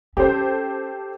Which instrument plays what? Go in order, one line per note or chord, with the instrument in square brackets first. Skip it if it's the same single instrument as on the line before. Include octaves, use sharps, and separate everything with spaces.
[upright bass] C#4 [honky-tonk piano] G4 A4 C5